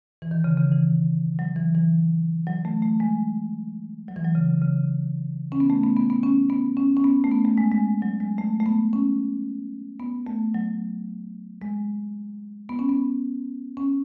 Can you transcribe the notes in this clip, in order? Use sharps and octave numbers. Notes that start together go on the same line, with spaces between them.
E3
D#3
C#3
C#3
E3
F#3
E3
E3
F#3
A3
A3
G#3
F#3
E3
F#3
C#3
C#3
C#4
B3
A3
B3
B3
B3
C#4
B3
C#4
C#4
B3
A3
B3
A3
G#3
G#3
F#3
G#3
A3
A3
B3
C#4
B3
A3
F#3
G#3
B3
C#4
B3
C#4